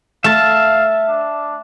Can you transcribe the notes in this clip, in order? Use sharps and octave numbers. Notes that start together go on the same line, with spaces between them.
A3 E5 F5 A5
D4